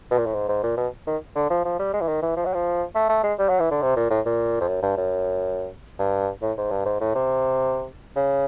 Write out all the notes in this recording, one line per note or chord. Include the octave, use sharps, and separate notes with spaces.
B2
A#2
A2
G#2
G#2
A#2
B2
D#3
D3
F3
F3
G3
G#3
E3
D#3
E3
F3
F#3
F3
A3
A3
G#3
G3
F#3
E3
D3
C3
A#2
A2
A#2
F2
F#2
G2
F#2
G2
A2
G#2
G2
G#2
A2
C3
C#3